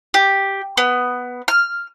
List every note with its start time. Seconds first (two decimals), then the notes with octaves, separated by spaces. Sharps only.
0.14 G4
0.77 B3
1.48 F6